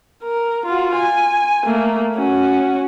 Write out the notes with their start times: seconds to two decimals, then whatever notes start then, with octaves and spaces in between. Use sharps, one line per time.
0.23 A#4
0.66 F4 F#4
0.96 G#5
1.65 A3 A#3
2.16 C#4 F#4